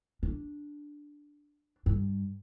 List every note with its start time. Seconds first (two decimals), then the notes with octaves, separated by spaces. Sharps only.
0.23 D4
1.86 G2